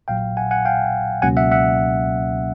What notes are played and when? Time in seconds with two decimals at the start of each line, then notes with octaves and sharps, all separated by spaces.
0.08 A#1 A#2 F#3 F5 G5
0.37 F#5 G#5
0.51 F#5 G#5
0.65 F5 G5
1.22 C#2 B2 F#3 A#3 C#4 F#5 G#5
1.37 E5 F#5
1.51 E5 F#5